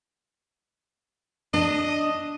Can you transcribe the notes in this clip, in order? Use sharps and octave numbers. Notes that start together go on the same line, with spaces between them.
D4 D#5